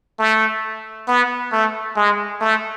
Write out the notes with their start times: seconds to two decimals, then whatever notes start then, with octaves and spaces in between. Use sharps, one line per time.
0.19 A3
1.08 B3
1.53 A3
1.96 G#3
2.41 A3